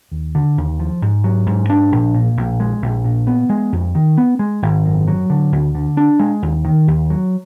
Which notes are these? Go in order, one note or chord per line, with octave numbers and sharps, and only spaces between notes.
D#2
D3
D#2
F3
G#2
F#3
G#2
D4
A#1
A#2
A#1
G#3
A#1
A#2
B3
G#3
F2
D#3
B3
G#3
G#1
F#2
F#3
D3
D2
D3
D4
G#3
D#2
D#3
D#2
F#3